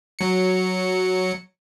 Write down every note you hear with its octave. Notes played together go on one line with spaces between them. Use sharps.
F#3 C#7